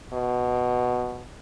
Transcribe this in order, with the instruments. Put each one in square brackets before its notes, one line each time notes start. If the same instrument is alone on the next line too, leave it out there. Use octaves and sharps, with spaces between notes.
[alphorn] B2